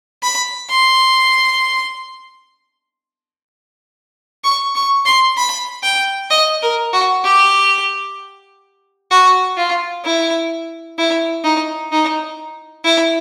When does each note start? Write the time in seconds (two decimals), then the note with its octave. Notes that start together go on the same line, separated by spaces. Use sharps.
0.23 B5
0.70 C6
4.44 C#6
4.75 C#6
5.06 C6
5.38 B5
5.84 G5
6.31 D#5
6.62 A#4
6.93 F#4
7.24 G4
9.11 F#4
9.57 F4
10.04 E4
10.98 E4
11.44 D#4
11.92 D#4
12.85 E4